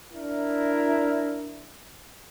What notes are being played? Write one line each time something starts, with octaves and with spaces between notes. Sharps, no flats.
D4 E4 A#4